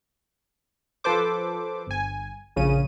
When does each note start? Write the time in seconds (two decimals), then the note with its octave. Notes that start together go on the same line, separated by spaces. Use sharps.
1.04 F3 A4 B4 C5 D6
1.87 G1 G#5
2.56 A#1 C#3 C#4 D#7